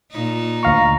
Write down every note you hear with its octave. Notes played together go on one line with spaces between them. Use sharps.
A#2 D#4
D2 F5 A#5 C#6